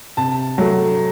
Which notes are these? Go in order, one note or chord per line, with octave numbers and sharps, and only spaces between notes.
C3 A5
F#3 A3